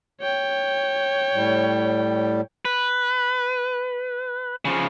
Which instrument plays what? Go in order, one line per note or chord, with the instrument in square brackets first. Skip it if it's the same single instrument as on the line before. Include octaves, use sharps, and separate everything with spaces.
[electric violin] C#5 G5
[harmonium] A2 G3
[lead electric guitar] B4
C#3 F3